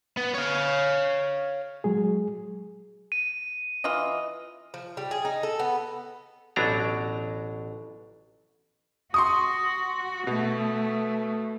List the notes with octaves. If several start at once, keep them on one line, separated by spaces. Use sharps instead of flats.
B3
C#5 F5
F#3 G#3 G#4
D#7
E3 F4 D#5
F3
G3
G#4
D#4
A4
B3
A1 B2 F#3 D4 A#5
F#4 C6 C#6 D#6
B2 A3